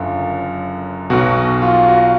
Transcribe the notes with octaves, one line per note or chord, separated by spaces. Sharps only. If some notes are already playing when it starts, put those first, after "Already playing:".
Already playing: F#1 F#2 D3 F4
B1 B2 F#4
F4
F#4